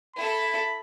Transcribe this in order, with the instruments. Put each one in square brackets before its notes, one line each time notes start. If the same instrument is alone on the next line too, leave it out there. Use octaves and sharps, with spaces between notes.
[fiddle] E4 A4 [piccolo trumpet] B5